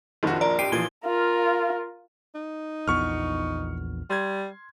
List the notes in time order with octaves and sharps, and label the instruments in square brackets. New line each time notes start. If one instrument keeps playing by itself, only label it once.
[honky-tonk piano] A#1 F2 F3 [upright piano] D#3 F#4
[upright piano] A#4 A#5 [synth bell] D5
[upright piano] G4 [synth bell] C7 D7 D#7
[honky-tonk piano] A#2 [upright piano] E3 F3 [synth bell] G#6 G7
[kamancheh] F4 A#4
[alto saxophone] D#4
[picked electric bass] A#1 E2 B3 [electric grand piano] C#6 F6
[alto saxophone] G3 [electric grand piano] C6 G#6